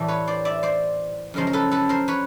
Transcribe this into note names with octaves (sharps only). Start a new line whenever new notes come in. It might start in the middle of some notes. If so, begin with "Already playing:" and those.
Already playing: A2 E3 G3
B4 C#5
C5 D5
D5 E5
C5 D5
F#2 C#3 F3 G#3 A#4 C5
A#4
A4 B4
A4 B4
A#4 C5
B4 C#5